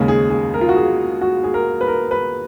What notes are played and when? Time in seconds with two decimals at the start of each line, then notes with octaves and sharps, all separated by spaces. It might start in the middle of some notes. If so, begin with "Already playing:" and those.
Already playing: D#2 C#3 G#3
0.08 G#4
0.30 G#4
0.54 A#4
0.61 F4
0.69 F#4
0.76 G#4
1.21 F#4
1.44 G#4
1.54 A#4
1.81 B4
1.88 A#4
2.11 B4